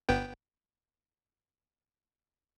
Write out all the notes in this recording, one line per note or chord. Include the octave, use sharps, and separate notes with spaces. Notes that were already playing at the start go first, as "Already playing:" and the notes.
G1 B3 G5